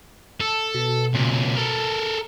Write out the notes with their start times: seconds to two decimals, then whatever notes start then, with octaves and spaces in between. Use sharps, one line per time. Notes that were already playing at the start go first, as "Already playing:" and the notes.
0.41 A4
0.74 B2
1.14 C#2 A#2
1.56 A4 A#4